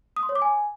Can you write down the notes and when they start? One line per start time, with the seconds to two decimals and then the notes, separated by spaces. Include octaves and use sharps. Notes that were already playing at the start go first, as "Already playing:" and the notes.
0.16 D#6
0.23 C6
0.29 C#5
0.35 D6
0.42 G#5